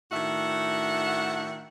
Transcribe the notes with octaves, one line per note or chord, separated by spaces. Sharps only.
A2 D#3 D4 F#4 E5 F#5